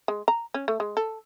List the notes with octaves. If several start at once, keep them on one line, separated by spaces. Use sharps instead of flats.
G#3
A#5
C#4
A3
G#3
A4